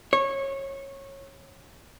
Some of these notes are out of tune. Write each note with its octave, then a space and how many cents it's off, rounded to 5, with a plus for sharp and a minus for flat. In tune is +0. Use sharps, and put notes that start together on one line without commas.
C#5 -20